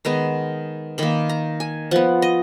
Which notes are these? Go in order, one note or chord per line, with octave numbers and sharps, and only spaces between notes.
D#3 G#3 B3 A#5
D#3 A#3 B5
A#5
G#5
F3 B3 F#5
D#5